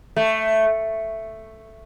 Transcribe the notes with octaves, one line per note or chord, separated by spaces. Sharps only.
A3